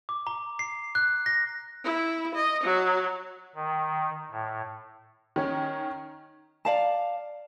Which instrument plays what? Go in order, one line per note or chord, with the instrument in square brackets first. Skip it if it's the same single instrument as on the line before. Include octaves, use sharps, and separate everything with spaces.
[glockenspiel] D6
A#5
C7
F#6
A#6
[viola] E4
D#5
F#3
[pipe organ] D#3
A2
[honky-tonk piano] D#3 C#4
[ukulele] D5 F5 A5